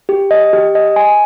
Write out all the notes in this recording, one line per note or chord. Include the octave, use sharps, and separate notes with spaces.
G4
D#5
G4
D#5
G#5